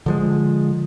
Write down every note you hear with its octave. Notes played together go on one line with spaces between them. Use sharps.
D3 F3 G#3